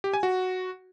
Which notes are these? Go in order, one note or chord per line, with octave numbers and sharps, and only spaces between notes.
G4
G#5
F#4